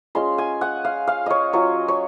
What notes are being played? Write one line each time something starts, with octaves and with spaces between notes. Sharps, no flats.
G#3 C#4 F4 C6
G#5
F#5
F5
F5
C#5 D#5
F#3 C#4 F4 C#5
C#5